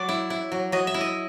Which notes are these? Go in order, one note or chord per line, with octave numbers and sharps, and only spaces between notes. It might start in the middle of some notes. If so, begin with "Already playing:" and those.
Already playing: F#3 D5
E4
E4
F#3
F#3 D#5
E5
E4
D#5